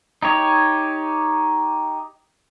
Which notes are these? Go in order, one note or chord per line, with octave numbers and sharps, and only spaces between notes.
D#4 G4 C#5